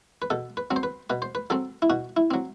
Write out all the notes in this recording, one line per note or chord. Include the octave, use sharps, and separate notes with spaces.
B4
B2 A4
B4
F#3 C4
C5
B4
B2 B4
C5
B4
F#3 C4 A4
E4
B2 F#4
E4
F#3 C4